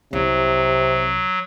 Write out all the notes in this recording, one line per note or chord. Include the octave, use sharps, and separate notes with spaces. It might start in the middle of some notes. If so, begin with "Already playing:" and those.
C2 C3 F#3